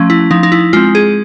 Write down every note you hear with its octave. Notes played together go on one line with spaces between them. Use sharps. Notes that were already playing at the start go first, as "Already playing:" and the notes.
Already playing: F3 A3 C#4
E4
F3 D#4
D#4
E4
G#3 C4 F4
G#4